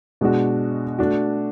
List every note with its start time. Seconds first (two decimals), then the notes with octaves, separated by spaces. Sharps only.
0.21 B2 G#3 D4 F#4
0.99 A3 D4 F#4